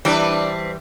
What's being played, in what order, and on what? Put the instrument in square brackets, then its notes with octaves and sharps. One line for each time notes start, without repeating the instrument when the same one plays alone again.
[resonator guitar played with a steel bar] E3 G3 [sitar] C4 D4 B4 [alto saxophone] D5